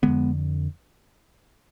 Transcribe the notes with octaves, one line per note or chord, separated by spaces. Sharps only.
F2 D3 G#3 B3